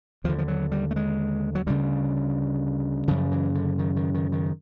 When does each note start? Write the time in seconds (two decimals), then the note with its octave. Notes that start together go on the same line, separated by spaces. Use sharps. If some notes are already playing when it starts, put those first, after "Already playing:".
0.24 D#2 D3 F3
0.39 F3
0.48 F#3
0.72 G3
0.91 A3
0.96 G#3
1.55 F#3
1.66 D2 C#3 G3
3.08 F#2 C#3 F3
3.32 E3
3.55 D3
3.79 D#3
3.96 D#3
4.14 D#3
4.32 D#3